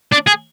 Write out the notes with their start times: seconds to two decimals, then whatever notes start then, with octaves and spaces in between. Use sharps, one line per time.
0.13 D4
0.27 G#4